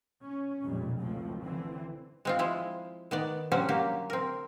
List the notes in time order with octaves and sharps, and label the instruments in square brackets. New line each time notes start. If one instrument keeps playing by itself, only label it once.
[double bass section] C#4
F1 B1 F2 A#2 G3 G#3
F1 C#2 F#2 A2 F3 C4
D3 E3 C4
[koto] G#3 C4 F4
F3 G#3 E4
D#3 B3 D5
D3 F#3 G3 C4 C#4
F#3 A#3 G4
C4 A#4